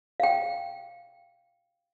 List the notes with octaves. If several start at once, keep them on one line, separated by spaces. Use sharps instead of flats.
F5 G5